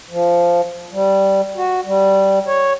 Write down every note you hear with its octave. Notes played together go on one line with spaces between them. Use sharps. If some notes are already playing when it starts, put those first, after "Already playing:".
F3
G3
F#4
G3
C#5